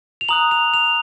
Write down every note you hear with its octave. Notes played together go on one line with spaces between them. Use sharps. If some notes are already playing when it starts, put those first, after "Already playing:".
F7
A#5 D#6 F#6 F#7
F7
F7